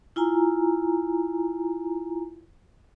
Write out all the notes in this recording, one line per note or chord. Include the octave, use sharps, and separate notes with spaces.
E4 F4 G#5 A#5